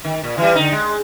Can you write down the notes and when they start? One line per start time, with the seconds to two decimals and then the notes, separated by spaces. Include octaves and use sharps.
0.05 D#3
0.23 A#2
0.38 E3 G3
0.55 D3 D#4
0.72 G#3